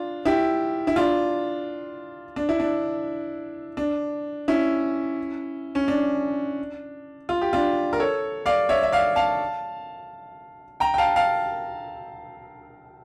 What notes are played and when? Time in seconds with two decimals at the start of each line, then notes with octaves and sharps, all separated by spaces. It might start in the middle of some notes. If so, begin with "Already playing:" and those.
Already playing: D4 F4
0.25 E4 G4
0.87 E4
0.96 D4 F4
2.36 D4
2.49 E4
2.60 D4
3.77 D4
4.48 C#4 E4
5.75 C#4
5.88 D4
7.29 F4
7.41 G4
7.53 D4 F4
7.93 A#4
7.99 A4 C#5
8.46 D5 F5
8.69 C#5 E5
8.83 E5
8.92 D5 F5
9.16 F5 A5
10.80 G5 A#5
10.94 G5
10.98 F5 A5
11.16 F5 A5